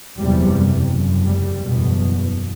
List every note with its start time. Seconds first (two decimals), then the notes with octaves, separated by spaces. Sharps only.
0.18 F#1 E2 C3 G3
0.90 F#1 F#2
1.26 G3
1.63 F#1 E2 B2